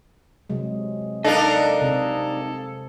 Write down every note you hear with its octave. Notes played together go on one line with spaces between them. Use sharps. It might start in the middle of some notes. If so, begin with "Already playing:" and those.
C3 F#3 G#3
D4 D#4 A4 A#4 D#5 F5
C3 C4 G#4 A4